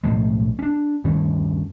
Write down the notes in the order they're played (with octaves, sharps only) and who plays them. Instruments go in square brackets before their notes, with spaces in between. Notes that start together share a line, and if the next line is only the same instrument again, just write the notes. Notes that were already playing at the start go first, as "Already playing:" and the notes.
[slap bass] B1 A2 F3 G#3
C#4 D4
D2 G2 D#3 C#4